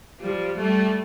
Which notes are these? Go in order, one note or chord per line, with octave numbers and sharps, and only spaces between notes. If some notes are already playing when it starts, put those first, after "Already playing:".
F3 G3
G3 A3